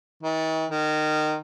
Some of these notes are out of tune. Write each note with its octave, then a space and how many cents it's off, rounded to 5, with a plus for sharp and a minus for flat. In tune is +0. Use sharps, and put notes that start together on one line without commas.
D#3 +45
D#3 -20